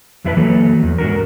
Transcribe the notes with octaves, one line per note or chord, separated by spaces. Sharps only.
F2 G#3 E4 F4 B4 A5
E3 F#3 A#3 A4
E2
G#2 D4 F#4 A#4